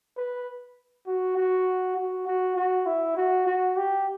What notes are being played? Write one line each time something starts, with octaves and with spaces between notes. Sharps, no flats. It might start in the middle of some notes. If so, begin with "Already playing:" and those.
B4
F#4
F#4
F#4
F#4
F#4
E4
F#4
F#4
G4